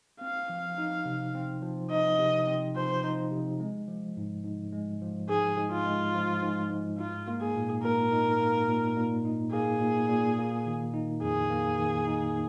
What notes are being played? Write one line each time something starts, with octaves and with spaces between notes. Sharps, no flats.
C4 F5
F3
D#4
C3
C4
F3
D#4 D#5
C3
C4
F3 C5
D#4
C3
G#3
F3
G#2
G#2
G#3
F3
G#2 G#4
G#2
F4
G#3
F3
G#2
G#2
D#4 F4
A#3
G#4
A#2
A#2 A#4
D#4
A#3
A#2
A#2
D#4
A#3 G#4
A#2
A#2
A#3
D#3
D#4
F2 G#4
A#3
D#3
D#4